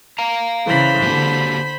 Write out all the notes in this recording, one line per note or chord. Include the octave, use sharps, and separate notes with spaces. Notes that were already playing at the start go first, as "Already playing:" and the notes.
F5 A#5
C#3 E3 C5 B5
D3 A#3 F#4 G4